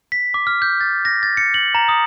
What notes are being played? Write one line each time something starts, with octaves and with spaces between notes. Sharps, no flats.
B6
D6
F6
G6
A6
A#6
A6
C#7
F#7
A#5
D#6